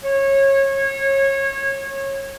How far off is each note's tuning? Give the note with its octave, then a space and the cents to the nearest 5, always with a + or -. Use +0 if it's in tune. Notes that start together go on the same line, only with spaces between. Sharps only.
C#5 -25